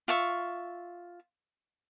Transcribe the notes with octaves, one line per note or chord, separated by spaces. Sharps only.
F4 E5 C#6